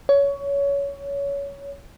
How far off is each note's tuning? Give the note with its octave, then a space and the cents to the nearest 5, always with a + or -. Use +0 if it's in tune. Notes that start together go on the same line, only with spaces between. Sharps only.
C#5 +20